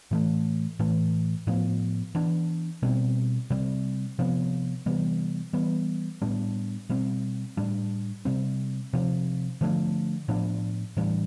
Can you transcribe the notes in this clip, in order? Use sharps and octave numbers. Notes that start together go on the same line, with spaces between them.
A2 E3 A3
A2 E3 A3
A2 F3 B3
E3 B3 D4
B2 G3 C4
C3 G3 C4
C3 F3 B3
C3 E3 G3 B3
E3 G3 B3
A2 G3 B3 D4
B2 G3 C4
A2 G3 D4
C3 G3 C4
C3 F3 C4
D3 F3 A3 D4
A2 F3 B3 D4
A2 E3 G3 D4